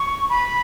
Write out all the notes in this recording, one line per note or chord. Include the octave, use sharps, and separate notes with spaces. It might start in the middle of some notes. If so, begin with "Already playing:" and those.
Already playing: C#6
B5